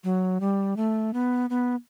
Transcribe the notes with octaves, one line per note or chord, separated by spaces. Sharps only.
F#3
G3
A3
B3
B3